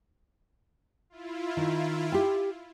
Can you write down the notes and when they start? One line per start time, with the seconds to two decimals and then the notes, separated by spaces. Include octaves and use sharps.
1.10 E4 F4
1.57 D#3
2.12 G4 G5